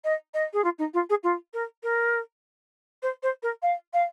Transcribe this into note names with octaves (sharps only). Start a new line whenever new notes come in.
D#5
D#5
G#4
F4
D#4
F4
G#4
F4
A#4
A#4
C5
C5
A#4
F5
F5